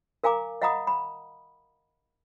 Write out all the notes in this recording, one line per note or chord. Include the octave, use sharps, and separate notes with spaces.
A#4 F5 G#5 A#5 D6
D#5 F5 F#5 A#5 B5 D#6
B5